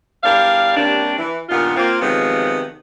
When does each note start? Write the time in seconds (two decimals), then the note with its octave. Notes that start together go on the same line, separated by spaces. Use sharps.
0.24 E2 G3 D4 A#4 F5
0.76 C3 G3 A#3 C#4 D4
1.18 E3
1.49 G2 A#2 D#3 B3 F4
1.76 A#3 C4 F4
2.00 C3 D#3 F3 F#3 G#3 B3